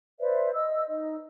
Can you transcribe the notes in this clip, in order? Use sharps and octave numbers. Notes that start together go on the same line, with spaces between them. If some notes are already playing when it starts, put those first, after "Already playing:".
B4 C5 D5 E5
D#5 E6
D#4 D#5